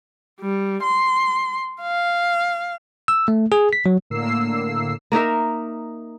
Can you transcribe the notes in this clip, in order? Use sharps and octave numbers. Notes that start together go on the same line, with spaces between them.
G3
C6
F5
E6
A3
G#4
B6
F#3
A2 D3 A#3 E6 C7
A#3 D#4 A#4 E5